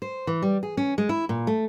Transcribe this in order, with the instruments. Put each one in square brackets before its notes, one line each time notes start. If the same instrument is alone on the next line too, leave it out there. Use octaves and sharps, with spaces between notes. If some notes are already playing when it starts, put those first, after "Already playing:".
[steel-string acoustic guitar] C5
E3
G3
G#4
C#4
G#3
E4
A#2
A3